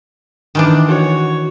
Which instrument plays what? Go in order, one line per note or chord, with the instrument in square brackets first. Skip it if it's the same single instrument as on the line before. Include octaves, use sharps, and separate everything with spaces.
[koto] D#3 E3 D4
[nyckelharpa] F#4 C#5